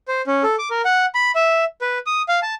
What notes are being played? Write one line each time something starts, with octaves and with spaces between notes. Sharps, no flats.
C5
C#4
A4
D6
A#4
F#5
B5
E5
B4
D#6
F5
A5